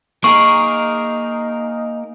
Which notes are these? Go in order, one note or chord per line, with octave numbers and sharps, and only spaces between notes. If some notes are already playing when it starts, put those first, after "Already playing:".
A#3 D#4 G#4 A#4 C#6